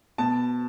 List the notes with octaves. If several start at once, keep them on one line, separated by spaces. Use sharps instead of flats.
B2 A5